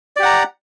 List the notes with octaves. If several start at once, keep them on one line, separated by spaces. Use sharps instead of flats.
G4 D5 F#5 A#5